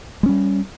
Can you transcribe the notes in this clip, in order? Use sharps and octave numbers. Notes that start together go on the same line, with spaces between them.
G3 G#3 C#4